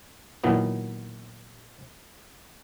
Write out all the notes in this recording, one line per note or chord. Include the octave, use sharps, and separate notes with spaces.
A#2 D#3 E3 F#3 B3